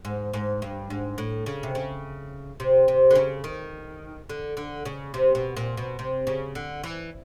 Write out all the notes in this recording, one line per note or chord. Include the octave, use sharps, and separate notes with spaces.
G#2
G#2
G2
G#2
A2
C#3
C3
C#3
C3
C3
D3
C#3
D#3
D3
D3
C#3
C3
B2
A#2
B2
C3
C#3
D3
E3